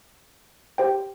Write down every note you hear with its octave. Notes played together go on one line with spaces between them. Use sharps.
G4 C5 G5